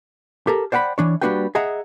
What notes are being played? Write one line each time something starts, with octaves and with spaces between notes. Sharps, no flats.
G4 A4 A#4
C5 D5 F#5 G5 B5
E3 D4 C#5
G3 A#3 D4 F#4 B4 G5
G#4 D#5 E5 F#5 A#5